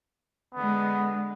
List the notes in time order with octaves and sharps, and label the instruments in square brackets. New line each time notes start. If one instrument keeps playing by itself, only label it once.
[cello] D3 G#3 [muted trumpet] B3